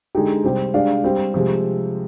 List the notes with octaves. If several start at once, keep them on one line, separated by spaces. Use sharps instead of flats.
D3 G#3 D#4 G4
C3 G3 C4 G4
G#3 D4 G4 D5 F5
G3 C4 G4
C3 F3 G#3